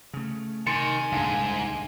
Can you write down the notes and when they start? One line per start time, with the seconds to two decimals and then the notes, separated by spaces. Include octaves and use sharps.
0.13 C#3 A3
0.67 C3 D#3 G#5 C6 A6 C#7
1.12 D#1 G#1 C#2 G#2 D3 F5